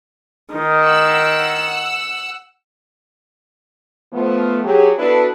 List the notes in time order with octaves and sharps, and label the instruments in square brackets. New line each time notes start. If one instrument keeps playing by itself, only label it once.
[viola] D#3
[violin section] F#5 E6
[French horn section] F3 A3 B3
F#3 G4 G#4
B3 D4 E4 F#4 A4 B4